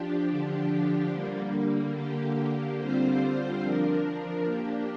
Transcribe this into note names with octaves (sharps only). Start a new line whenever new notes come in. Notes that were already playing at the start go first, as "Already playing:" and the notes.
Already playing: F3 D4 G4
D3 F3 D4 G4
D3 G3 A#3
D3 A#3 G4
D3 G3 C4 F4 C5
F3 D4 A#4
A#3 D4 G4